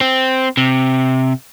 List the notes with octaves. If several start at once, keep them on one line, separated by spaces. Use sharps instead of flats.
C4
C3